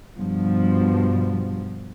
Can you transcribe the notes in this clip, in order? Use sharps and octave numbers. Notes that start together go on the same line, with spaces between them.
G2 B2 F3